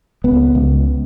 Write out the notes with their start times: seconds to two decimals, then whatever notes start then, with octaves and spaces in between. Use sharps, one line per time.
0.24 C#2 B3
0.55 C#2